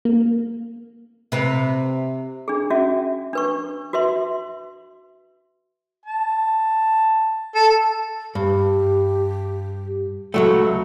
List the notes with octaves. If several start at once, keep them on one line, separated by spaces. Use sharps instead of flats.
A#3
C3 B4
D4 G#4
C#4 F#4 E5
D4 B4 C#6
F#4 B4 E5 C6
A5
A4
G2 G4
C#2 F#3 A3